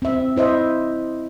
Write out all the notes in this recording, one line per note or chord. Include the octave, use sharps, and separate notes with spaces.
C4 E5
E4 C5 D#5 E5